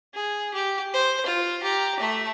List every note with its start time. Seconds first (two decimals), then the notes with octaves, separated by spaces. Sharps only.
0.14 G#4
0.54 G4
0.93 C5
1.26 F4
1.62 G4 A#5
2.00 A3 E5